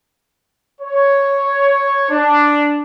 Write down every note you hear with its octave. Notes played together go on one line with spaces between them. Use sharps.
C#5
D4